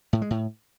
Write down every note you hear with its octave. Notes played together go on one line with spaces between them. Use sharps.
A2
G#3
A2